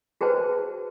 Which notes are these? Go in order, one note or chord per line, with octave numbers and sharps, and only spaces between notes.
F#4 G#4 B4 C5 A5